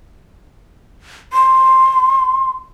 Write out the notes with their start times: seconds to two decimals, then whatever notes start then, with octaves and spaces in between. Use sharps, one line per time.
1.33 C6